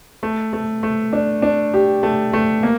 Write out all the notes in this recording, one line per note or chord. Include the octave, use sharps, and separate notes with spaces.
A3
A3
A3
D4
D4
G4
A3
A3
A#3